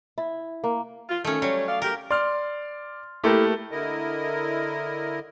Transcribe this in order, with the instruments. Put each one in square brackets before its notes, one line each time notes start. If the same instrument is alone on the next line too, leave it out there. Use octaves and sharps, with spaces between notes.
[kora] E4
A#3
[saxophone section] F4
[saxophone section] D#3 [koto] A3 C#4
[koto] F#3 [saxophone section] G3 C#4 C#5
[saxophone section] D5 D#5 F5
[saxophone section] G4 [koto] A#4
[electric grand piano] D5 [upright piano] C6 F6
[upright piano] A3 A#3 G4 [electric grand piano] E4 A4 A#4
[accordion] D3 E4 A#4 D#5